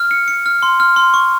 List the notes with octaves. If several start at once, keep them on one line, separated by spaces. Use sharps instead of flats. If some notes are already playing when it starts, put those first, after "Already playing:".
Already playing: F6
C#7
C#7
F6
C6
F6
C6
C#6